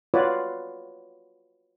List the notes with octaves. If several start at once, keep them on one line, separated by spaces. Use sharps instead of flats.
F4 F#4 B4 C#5 D5